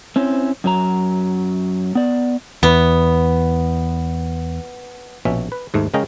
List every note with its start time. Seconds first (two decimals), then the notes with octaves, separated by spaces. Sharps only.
0.16 C4 C#4 E4 C5
0.64 F#2 F#3 A#5
1.95 B3 D5
2.63 E2 B3
5.25 A#1 B2 C#4 E5
5.52 B4
5.74 D#2 G#2 A3
5.94 C#3 G#3 C#4 A#4 D#5 G5